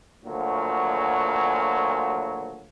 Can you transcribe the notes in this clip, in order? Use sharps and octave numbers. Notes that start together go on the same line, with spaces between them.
D2 A#2 C#3 F3 F#3